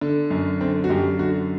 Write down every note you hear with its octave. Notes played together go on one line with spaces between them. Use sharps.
D3
F#2
D3 C4
F#4
F#2 G4
D3 F#4